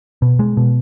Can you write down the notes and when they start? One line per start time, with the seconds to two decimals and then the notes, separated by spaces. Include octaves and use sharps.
0.22 B2
0.39 G#3
0.57 B2